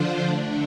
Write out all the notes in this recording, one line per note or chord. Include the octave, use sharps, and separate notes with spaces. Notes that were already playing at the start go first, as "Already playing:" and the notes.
Already playing: D3 F3 D4 F4 C5
D3 A3 D4